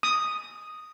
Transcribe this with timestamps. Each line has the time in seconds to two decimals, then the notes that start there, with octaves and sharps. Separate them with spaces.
0.03 D#6